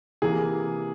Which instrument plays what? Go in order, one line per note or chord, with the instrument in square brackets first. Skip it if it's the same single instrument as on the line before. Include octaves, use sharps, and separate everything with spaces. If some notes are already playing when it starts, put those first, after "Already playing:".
[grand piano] C3 E3 A#3 G#4